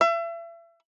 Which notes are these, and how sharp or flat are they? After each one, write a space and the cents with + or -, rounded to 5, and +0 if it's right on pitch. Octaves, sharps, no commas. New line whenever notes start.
E5 +35